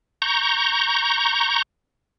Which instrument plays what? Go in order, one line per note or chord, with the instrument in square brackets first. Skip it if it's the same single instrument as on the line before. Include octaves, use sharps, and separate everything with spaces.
[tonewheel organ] A#5 C#6 G6